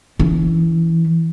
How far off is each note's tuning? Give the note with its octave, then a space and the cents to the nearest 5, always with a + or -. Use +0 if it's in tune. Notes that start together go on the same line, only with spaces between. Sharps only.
E3 +0 C#4 +25